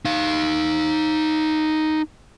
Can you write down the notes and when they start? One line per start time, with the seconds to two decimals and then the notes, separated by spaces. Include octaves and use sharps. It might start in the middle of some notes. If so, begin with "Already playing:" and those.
0.05 D#4 F5